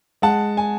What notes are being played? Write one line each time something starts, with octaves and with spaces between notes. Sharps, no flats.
G#3 F#5 A5
G#5